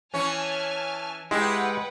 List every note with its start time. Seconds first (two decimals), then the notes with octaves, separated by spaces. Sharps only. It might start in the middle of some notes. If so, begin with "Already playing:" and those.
0.14 E3 C#4 G#5 A5 F6
1.31 G#3 E4 G4 B4 F#5 G5